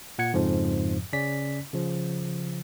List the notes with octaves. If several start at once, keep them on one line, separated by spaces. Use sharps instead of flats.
A#2 F#5 G#6 C#7
F2 G#2 C#3 F3
C#3 C#4 D5 B6
C#3 F3